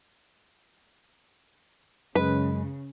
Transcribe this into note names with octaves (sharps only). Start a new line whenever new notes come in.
F#2 C#3 G#3 B4